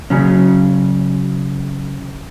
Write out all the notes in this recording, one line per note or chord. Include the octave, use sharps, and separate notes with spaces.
C#3 F#3 C#4